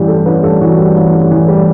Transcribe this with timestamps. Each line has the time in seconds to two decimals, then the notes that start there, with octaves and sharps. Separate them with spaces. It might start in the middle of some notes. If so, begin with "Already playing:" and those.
Already playing: A1 G2 E3 G4
0.08 G3 A4
0.26 A1 B4
0.44 G2 A4
0.61 E3 F#4
0.79 G3
0.96 A1
1.14 G2
1.31 E3
1.48 G3